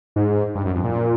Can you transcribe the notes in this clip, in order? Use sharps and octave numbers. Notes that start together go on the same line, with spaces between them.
G#2
G2
F#2
F2
A#2